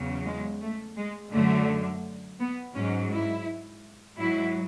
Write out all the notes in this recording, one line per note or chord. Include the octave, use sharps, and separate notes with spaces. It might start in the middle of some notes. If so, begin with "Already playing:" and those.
Already playing: E2 C#3 F#3
G#3
A3
G#3
F#2 D3 F#3 A3
B3
G#2 F#3 C#4
E4
G#2 F#3 E4